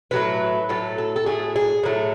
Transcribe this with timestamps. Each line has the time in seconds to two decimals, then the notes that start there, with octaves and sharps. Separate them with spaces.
0.11 A2 F#3 A3 B4
0.69 A2 F#3 A3 A4
0.98 A4
1.16 A4
1.26 A2 F#3 A3 G#4
1.56 G#4
1.83 A2 F#3 A3